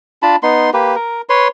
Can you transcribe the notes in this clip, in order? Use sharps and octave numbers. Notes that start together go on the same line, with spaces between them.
D4 F4 A5 B5
B3 D#4 C6
A#3 G4 B4
A#4
B4 C#5 C6